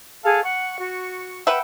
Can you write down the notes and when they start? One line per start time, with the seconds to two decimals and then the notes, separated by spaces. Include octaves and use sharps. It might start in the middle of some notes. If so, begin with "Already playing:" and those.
0.25 G#4 A4 F5 A5
0.44 F#5 C#6
0.79 F#4
1.47 B4 E5 F#5 G5